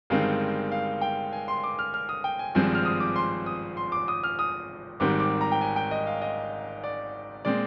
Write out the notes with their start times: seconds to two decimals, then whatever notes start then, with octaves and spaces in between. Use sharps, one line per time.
0.10 G1 G2 D#3 G#3 C4 F5
0.71 F5
1.02 G5
1.33 G#5
1.48 C6
1.64 D6
1.79 F6
1.94 F6
2.09 D#6
2.24 G5
2.39 G#5
2.55 G#1 G2 F3 G#3 C4 G#5
2.75 F6
2.85 D#6
3.00 D6
3.16 C6
3.46 D#6
3.77 C6
3.92 D6
4.08 D#6
4.24 F6
4.39 D#6
5.00 G#1 G#2 D#3 G3 C4 D6
5.20 D6
5.41 A#5
5.52 G5
5.61 G#5
5.76 G5
5.91 D#5
6.07 F5
6.22 D#5
6.84 D5
7.45 A#2 G#3 C4 D5